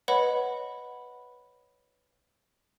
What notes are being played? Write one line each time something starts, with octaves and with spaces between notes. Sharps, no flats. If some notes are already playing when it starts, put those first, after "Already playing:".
B4 C#5 D#5 F#5 B5